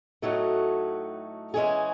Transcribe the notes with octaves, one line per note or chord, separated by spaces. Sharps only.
A2 F#3 A3 D#4 F#4
E3 G#3 C#4 G#4